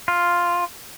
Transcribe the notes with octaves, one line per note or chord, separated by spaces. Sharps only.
F4